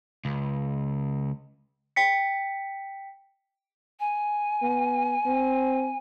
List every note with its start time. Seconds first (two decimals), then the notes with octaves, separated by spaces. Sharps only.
0.25 C#2
1.96 G5 B6 C#7
4.00 G#5
4.62 B3
5.26 C4